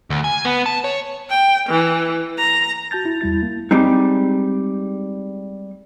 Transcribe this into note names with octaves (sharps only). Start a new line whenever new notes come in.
D2
G#5
B3
A5
C#5
G5
E3
A#5
F#4 A5 G6 A6
E4
E2 G3 E4 A6
A#3
G3 G#3 C4 D#4